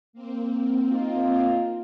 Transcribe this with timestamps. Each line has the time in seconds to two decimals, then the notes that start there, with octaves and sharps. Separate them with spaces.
0.13 A#3 C4
0.91 D#4 F4